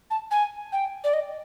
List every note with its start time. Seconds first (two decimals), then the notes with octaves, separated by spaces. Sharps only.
0.11 A5
0.31 G#5
0.73 G5
1.04 D5
1.13 D#5